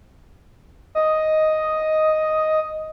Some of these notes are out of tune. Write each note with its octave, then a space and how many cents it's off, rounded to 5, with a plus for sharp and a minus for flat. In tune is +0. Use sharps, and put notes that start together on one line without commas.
D#5 +5